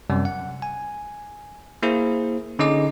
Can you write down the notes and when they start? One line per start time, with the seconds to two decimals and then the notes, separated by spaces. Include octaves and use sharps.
0.10 F#2 C3 G3
0.25 F#5
0.62 G#5
1.83 A#3 E4 G#4 C5
2.59 D3 C#4 D#4 G#4 D#5 D6